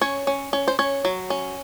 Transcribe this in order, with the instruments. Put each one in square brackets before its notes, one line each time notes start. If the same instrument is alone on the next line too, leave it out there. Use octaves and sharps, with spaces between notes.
[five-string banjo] C#4 C#5
C#4
C#4
C5
C#4 C#5
F#3
C#4